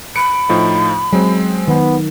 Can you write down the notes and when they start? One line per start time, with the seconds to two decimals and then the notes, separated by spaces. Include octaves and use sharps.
0.16 B5 C#7 D7
0.49 A2 F3 D#4
1.13 F#3 G#3 C4
1.68 D#3 B3